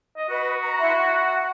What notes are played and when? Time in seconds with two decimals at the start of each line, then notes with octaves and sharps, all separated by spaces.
0.17 D#5
0.29 F#4 B4
0.61 A#5
0.79 E4 E5 C6
0.98 F#5